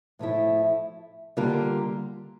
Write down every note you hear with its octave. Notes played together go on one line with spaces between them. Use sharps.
A2 F3 A3 E4
D3 G3 A#3 F4 A#4